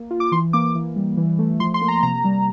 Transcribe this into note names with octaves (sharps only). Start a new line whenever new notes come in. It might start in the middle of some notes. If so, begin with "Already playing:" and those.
Already playing: A#3
F4
D6
E3 C6
A#3 D6
E3
G3
E3
A3
F3 C6
C6
A#3
A#5
C3 A#5
G3